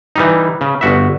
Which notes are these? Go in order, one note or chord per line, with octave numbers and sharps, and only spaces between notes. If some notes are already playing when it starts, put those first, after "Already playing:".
E3 G3 D#4
C#3
G1 F#4 E5